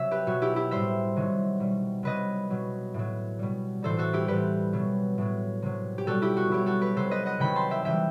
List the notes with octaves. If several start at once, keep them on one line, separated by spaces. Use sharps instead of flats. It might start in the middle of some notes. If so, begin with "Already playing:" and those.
Already playing: C3 F#3 E5
G4 B4
B2 F#3 F#4
E4 G4
E4 G4
A2 G3 C5 E5
C3 D#3 F#3
B2 G3
C3 F#3 B4 D#5
B2 F#3
A2 F#3
B2 G3
A2 E3 G3 A4 C5
F#4 A4
E4 G4
A2 E3 G3 G4 B4
B2 F#3
A2 F#3
C3 F#3
G4
B2 G3 F#4 A4
E4 G4
F#4
B2 F#3 E4 G4
F#4 A4
G4 B4
C3 F#3 A4 C5
B4 D#5
D#5 F#5
C3 D#3 F#3 G5 B5
A5 C6
E5 G5
C3 E3 G3 E5 G5